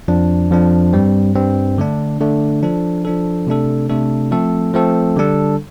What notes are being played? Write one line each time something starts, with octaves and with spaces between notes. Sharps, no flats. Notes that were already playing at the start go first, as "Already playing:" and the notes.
F2 F3 D4
F2 F3 D4
G2 G3 C4
G2 G3 C4
D3 A3 D4
D3 A3 D4
F3 D4 A4
F3 D4 A4
C3 A3 D4 A4
C3 A3 D4 A4
F3 A3 C4 A4
F3 A3 C4 A4
D3 G3 D4 A4